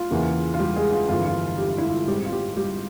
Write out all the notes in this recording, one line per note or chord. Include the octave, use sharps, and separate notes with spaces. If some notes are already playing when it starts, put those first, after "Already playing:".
Already playing: F4
E2 C#3 E3 A#3
F4
G3 G4
G#3 G#4
F4
G1 F2 E3 F4
F4
G4
F4
E4
F4
G#1 G#2 G3 C4 G4
F4
G3 G4
G3 G4